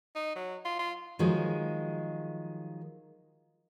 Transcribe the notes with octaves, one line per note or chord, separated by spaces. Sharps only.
D#4
F#3
F4
F4
D#3 F3 F#3 G#3